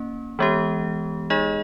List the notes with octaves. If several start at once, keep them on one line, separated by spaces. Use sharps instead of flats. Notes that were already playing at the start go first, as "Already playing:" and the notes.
Already playing: A#3 C#4
E3 G#3 B3 G4
G#3 D#4 G#4 D#5